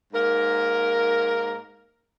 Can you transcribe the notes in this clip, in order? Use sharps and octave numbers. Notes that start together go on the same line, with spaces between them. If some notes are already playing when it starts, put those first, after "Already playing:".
G#2 A#3 A#4